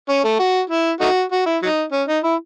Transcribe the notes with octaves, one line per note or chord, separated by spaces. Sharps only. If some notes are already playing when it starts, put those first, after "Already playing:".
C#4
A3
F#4
E4
A3 D#4 F#4
F#4
E4
F#3 D#4
C#4
D#4
E4